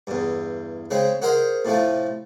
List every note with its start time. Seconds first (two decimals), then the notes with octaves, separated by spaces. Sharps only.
0.07 E2 G2
0.91 C#3 G#3 C4 G#4
1.22 F#4 G#4 A#4 C5 D#5
1.65 A2 C3 F3 A3